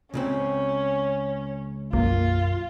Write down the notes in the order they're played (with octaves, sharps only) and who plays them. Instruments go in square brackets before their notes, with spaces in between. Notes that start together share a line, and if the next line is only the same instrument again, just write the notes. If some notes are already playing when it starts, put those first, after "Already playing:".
[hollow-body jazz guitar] C#2 C#3 C4 [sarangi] C#4
[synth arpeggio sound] B1 A#3 [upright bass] F#2 [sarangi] F4